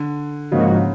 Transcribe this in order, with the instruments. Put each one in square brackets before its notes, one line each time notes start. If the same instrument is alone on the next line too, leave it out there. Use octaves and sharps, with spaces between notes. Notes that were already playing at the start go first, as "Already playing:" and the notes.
Already playing: [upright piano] D3
[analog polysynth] G#2 F3 A#3 D#4 F#4 [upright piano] C#3
[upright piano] C#3